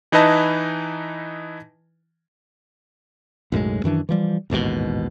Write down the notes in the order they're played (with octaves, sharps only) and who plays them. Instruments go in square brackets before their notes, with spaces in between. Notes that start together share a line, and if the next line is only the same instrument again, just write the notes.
[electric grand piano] E3 D#4 E4 B4 D#5 A5
[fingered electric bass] B1 F#2 A2 G#3
F#2 D#3 E3 D4
E3 F3 G3
A1 D#2 G#2 B2